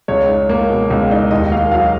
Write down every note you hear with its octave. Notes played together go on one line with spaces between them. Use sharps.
C#2 C#5
D#4
A#3
B2
C#2
D#4
D#2 D#5
A#3 F5
F#3 F5